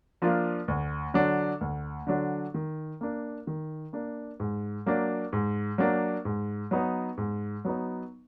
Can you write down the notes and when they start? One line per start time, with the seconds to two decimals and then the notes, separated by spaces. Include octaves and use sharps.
0.22 F3 A#3 D4 F4
0.68 D2
1.14 D3 F#3 D4
1.61 D2
2.07 D3 F#3 D4
2.54 D#3
3.01 A#3 D4
3.47 D#3
3.93 A#3 D4
4.40 G#2
4.86 F#3 A#3 D4
5.33 G#2
5.78 F#3 A#3 D4
6.25 G#2
6.71 F#3 B3 D#4
7.17 G#2
7.65 F#3 B3 D#4